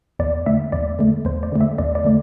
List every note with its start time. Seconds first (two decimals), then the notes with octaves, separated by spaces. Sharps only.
0.19 E2 D5
0.46 D3 A3 E5
0.72 E2 D5
0.99 D3 A3
1.25 E2 C5
1.43 D5
1.52 D3 A3
1.61 E5
1.78 E2 D5
1.95 D5
2.04 D3 A3